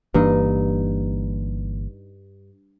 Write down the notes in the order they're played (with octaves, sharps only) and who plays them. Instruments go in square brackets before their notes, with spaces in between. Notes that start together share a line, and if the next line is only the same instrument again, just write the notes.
[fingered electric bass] G1 E3 A#3 [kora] G2 D#4